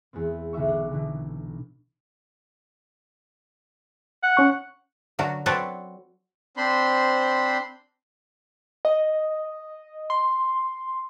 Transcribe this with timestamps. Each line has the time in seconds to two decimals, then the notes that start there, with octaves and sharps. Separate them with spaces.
0.13 E2 G#3 B3 C4
0.53 B1 D3 G#3 E5 C#6
0.68 D4 D6
0.91 B2 D3 E3
4.23 F#5
4.37 C#4 C#6
5.19 D3 F#3 F#4 A#4
5.46 F#3 C4 A4 B4 C#5 D5
6.57 C4 D4 C5 B5 C6
8.85 D#5
10.10 C6